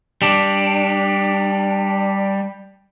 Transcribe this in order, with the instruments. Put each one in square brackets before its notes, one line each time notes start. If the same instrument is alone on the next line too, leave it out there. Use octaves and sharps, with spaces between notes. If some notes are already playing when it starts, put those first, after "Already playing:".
[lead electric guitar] G3 D4